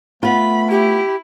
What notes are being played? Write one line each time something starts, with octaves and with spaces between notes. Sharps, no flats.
A3 B3 F4 B5
E4 G4